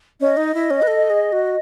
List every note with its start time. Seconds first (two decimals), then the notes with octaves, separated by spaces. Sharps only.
0.20 C#4 D#5
0.37 D#4
0.54 E4
0.70 C#4
0.82 B4
0.87 A4
1.10 G#4
1.32 F#4